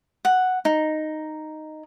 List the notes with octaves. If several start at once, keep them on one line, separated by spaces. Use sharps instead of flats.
F#5
D#4